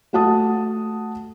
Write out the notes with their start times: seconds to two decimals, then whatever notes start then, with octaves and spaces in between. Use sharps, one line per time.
0.13 A3 F#4 F#5 A5 D#6